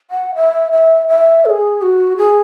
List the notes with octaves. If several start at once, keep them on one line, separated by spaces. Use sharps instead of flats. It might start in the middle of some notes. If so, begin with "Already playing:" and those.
F#5
E5
E5
E5
A4
G#4
F#4
G#4